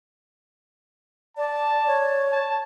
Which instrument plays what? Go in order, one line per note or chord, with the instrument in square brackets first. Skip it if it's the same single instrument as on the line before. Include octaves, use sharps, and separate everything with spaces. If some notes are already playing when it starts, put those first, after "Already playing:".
[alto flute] D5 [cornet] A5
[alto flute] C#5
[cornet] A5